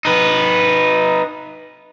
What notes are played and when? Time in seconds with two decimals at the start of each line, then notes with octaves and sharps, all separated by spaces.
0.05 D#4 B4